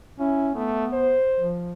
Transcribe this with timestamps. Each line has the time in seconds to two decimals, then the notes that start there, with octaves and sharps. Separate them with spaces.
0.19 C#4 E4
0.55 A3 B3
0.93 C5
1.37 F3